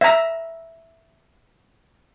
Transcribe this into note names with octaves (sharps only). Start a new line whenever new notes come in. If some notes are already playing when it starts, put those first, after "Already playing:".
E5 A#5